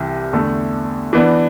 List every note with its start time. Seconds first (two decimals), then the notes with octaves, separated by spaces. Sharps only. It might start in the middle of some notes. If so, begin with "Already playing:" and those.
Already playing: C2 C3 E3
0.33 E2 D3 A3 D4 A4
1.13 E3 B3 D4